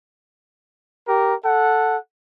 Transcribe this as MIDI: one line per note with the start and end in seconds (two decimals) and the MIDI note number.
1.08 1.35 67
1.08 1.35 70
1.44 1.97 69
1.44 1.97 78